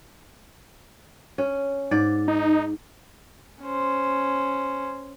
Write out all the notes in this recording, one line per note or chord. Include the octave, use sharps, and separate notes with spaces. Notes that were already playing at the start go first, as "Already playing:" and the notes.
C#4
G#2 D5
D#4
C#4 C5